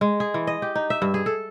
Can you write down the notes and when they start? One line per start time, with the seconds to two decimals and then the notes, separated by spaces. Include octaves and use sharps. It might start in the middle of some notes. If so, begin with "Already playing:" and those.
0.01 G#3
0.20 G#4
0.34 E3
0.47 D#5
0.62 G4
0.75 D#4
0.90 E5
1.02 G2
1.14 G#4
1.26 A4